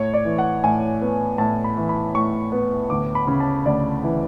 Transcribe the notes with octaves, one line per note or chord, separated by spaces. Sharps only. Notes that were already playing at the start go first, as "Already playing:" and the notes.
Already playing: A2 C#5
D5
E3
F#5
A2 G#5
B3
A2 A5
B5
E3
B5
A2 C#6
B3
D2 D6
B5
C#3
A5
D2 D5
E3